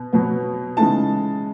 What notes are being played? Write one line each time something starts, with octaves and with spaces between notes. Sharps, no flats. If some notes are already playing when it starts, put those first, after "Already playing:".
Already playing: B2
B2 F#3 B3
C#3 E3 G#3 D#4 A5